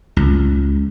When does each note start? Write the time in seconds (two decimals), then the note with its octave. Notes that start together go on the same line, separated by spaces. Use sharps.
0.17 C#2